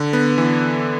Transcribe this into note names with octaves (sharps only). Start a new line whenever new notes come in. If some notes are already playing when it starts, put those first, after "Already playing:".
Already playing: D3
B3
E3